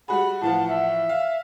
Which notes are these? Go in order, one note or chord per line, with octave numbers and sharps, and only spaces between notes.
G3 F#4 G#4 F#5 B5
A2 E3 F3 A5
E5
F5